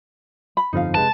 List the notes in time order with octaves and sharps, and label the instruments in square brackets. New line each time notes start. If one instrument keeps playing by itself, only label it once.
[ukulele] B5
[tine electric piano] G1 F2 F3 [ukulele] D#4 F5
[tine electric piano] C3 G#3 B4 [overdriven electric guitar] A5